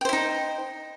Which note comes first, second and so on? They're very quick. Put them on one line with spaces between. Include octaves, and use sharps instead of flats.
G5 C5 E4 D#4